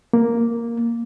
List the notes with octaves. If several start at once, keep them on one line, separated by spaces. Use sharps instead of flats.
A#3